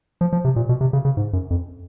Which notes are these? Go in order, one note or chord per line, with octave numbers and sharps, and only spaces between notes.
F3
F3
C3
A#2
B2
C3
C#3
C#3
G#2
F#2
F2